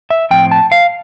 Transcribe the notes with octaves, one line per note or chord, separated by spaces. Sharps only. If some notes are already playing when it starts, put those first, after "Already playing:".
E5
A2 F3 C4 G5
A5
F5